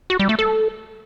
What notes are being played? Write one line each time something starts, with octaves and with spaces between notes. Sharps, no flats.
F#4
G3
A3
A4